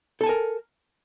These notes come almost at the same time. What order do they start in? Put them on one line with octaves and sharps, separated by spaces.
A4 A5 G#5 A#4